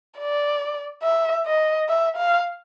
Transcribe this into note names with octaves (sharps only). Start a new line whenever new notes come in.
D5
E5
D#5
E5
F5